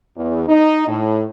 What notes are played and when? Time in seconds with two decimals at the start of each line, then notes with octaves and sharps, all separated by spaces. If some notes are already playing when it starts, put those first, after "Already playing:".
0.17 E2
0.48 D#4
0.87 A2